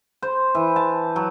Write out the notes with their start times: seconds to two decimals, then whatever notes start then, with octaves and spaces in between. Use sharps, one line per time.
0.22 C5
0.55 E3
0.76 A5
1.16 F#3